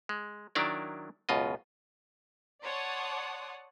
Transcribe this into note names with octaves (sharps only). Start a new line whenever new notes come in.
G#3
D#3 F#3 D4 E4 A#4 D5
C#2 F#2 B2 F4 D#5
C#5 D5 F#5 A5 C6 D#6